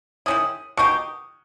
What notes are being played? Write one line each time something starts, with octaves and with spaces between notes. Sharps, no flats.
D#3 G#3 C#4 E4 D#6
B2 A#3 D#4 G4 C#6